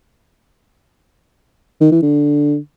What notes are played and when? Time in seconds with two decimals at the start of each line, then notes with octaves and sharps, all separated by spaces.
1.81 D#3
1.92 E3
2.02 D3